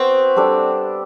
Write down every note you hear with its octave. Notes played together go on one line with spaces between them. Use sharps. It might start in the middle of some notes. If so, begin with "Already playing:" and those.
Already playing: B3 C4 F#4 B4
G3 D4 A4 D5